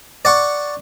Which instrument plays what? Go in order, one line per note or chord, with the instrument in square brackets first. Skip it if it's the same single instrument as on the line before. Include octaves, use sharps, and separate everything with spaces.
[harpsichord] D5 F#5 C#6